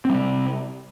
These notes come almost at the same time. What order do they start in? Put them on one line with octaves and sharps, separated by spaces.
C4 G3 C3